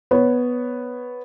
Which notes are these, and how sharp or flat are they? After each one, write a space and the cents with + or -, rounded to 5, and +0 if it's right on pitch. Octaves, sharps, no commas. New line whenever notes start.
B3 +0 C#5 +0